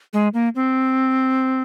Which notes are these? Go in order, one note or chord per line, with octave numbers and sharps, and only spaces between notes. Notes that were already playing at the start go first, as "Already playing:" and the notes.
G#3
A#3
C4